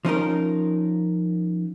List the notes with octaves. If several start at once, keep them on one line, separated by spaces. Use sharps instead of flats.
F3 C#4 D#4 A#4